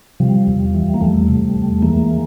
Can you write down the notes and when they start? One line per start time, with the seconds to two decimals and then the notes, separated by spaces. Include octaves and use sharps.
0.20 C3 F3 G3
0.47 E2
0.75 E3
0.94 A#3
1.01 E2 G3 A3
1.28 C3
1.55 E2
1.82 E3 G#3 A#3